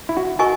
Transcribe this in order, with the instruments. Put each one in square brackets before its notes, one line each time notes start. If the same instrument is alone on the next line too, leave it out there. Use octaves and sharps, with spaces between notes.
[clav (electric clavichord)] E4
F#4
[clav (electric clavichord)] F#4 [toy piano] A#4 D#5 G#5 C#6